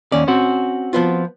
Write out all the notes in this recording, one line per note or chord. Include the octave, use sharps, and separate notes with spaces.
D#2 C#4 D5
C4 F#4 C5
F3 B3 F4